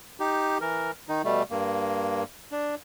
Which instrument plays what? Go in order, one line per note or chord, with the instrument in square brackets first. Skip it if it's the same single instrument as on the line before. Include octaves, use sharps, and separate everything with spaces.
[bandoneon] D#4 G4
E3 A#4
D#3 D#4
B2 G3 A3
G2 A#3
D4